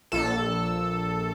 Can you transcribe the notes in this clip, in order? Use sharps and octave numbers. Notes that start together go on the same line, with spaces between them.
A#1 A4